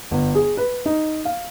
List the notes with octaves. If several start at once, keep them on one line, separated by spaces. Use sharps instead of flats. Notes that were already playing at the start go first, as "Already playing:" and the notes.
G1
G#4
B4
D#4
F5